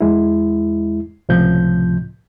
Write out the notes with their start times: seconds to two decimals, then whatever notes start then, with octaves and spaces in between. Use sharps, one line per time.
0.01 E2 G#3 E4
1.29 C#2 A2 C3 F3 G6